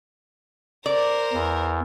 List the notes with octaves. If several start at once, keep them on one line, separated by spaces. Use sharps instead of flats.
A#4 C5 D5
E2